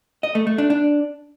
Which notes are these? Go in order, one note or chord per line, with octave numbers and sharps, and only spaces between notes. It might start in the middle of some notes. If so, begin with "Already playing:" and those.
D#5
A3
A3
D4
D4